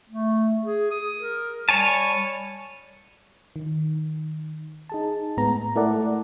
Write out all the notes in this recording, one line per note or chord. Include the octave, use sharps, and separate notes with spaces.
A3
G#4
D#6
A#4
G3 C#5 G#5 A5
D#3
D#4 G#4 A5
A2 G#3 B3 A#5
A3 E4 A4 A#4 D5 F#5